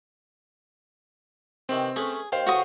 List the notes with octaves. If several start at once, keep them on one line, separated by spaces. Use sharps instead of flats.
C3 D#3 E3 C4
A3 C#4 G#4 B4
D#2 C5 F5 G5
E2 A2 F#4 C#6 D#6